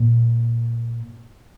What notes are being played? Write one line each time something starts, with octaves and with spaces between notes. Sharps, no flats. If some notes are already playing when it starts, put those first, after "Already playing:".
Already playing: A#2